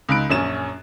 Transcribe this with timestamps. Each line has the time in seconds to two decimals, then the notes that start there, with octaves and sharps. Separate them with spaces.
0.09 C#2 D#4 B5 F#6 D7
0.29 A#1 F#2 C#4 E7